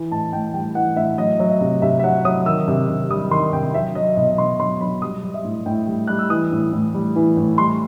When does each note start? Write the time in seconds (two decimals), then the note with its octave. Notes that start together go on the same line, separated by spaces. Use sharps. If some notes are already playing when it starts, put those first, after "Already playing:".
Already playing: E3
0.12 A2 A5
0.33 A2 G5
0.54 G3 G5
0.75 E3 F#5
0.96 A2 E5
1.18 F#3 D#5
1.40 F#3
1.50 E5
1.61 C3
1.82 C3 E5
1.99 E5
2.04 F#3 F#5
2.25 F#3 D#6
2.46 D#3 E6
2.68 C3
2.89 C3
3.10 G3 D#6
3.31 D#3 C6
3.53 C3 G5
3.74 F#3 E5
3.95 F#3 D#5
4.17 B2 D#5
4.38 B2 C6
4.60 F#3 C6
4.81 F#3 B5
5.02 G3 D#6
5.23 G3
5.34 E5
5.45 A2
5.66 A2 G5
5.87 G3
6.07 G3 F#6
6.19 E6
6.30 E3 D#6
6.52 A2
6.73 A2
6.95 G3
7.16 E3
7.37 A2
7.58 G3 C6